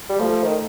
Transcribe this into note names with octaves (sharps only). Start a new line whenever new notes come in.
G3
F3 A3
D#3